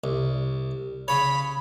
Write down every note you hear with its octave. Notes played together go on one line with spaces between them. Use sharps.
C2
C#3 C#5 B5